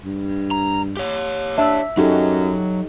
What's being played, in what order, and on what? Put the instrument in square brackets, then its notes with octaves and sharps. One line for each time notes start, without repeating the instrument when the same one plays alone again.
[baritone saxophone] G2
[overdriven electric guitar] A#5
G4 C#5
[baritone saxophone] D4 [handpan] E5
[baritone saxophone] F#2 [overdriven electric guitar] F#3 [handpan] D#4 G4 A4